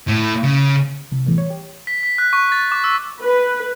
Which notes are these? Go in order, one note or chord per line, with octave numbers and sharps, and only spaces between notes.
A2
C#3
C2
E2 A2
C#5
G4
B6
B6
F#6
C#6
A6
D6
E6
B4